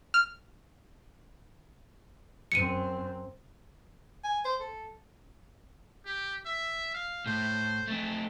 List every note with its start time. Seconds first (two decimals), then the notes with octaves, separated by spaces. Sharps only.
0.14 F6
2.52 F#2 C4 C#7 D#7
4.24 G#5
4.45 C5
4.61 A4
6.06 G4
6.45 E5
6.94 F5
7.26 A2 C5
7.87 A3 C4